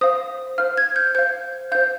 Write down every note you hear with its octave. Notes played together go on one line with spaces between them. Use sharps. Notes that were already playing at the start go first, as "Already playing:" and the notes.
C5 F5 D#6
C5 F5 F6
G#6
G6
C5 F5 G6
C5 F5 G6